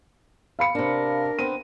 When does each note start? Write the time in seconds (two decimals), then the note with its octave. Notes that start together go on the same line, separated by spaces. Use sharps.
0.59 F5 B5 C#7
0.75 C3 D4 A#4
1.39 B3 C4 D#7